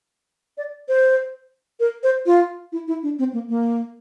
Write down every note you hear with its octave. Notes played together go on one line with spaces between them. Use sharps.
D5
C5
A#4
C5
F4
E4
E4
D4
C4
A#3
A#3